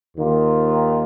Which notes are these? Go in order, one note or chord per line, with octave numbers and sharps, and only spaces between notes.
D#2 D#3 A#3 F4